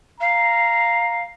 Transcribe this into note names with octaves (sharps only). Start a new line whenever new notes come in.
F5 A#5